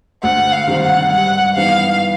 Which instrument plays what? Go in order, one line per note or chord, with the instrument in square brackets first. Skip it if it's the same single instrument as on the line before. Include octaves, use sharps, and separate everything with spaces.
[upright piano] D2 [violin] F#5
[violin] F5
[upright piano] C3 D#3 G3 C4
[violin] F#5
[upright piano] G2 [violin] F#5
[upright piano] E3 G3 B3 D#4 [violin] F5